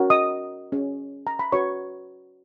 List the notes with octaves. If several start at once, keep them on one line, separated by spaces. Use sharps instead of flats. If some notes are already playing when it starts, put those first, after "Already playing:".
Already playing: C#4 F#4 A#4 C#5
D#5 D#6
C#4 G#4 C#5
A#5
B5
C#4 F#4 B4 C#5 C#6